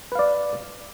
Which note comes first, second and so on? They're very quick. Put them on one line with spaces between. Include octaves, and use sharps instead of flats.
B4 F5 D5